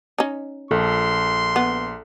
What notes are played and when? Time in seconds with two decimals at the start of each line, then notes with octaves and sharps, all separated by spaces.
0.18 C#4 D#4
0.71 A#1 A4 C6
1.56 B3